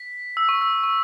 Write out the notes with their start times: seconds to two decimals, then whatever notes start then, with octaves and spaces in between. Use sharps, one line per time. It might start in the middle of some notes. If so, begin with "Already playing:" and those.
Already playing: B6
0.37 E6
0.49 C#6
0.61 E6
0.83 C#6